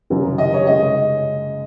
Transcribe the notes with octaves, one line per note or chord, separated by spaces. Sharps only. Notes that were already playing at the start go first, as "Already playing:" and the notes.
F#1 F#2 D#3 F#3 C#4
D#5
C#5
C#3 G#3 D#5